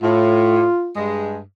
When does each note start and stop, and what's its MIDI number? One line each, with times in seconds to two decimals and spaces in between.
0.02 0.63 45
0.02 0.93 65
0.96 1.37 43
0.96 1.37 56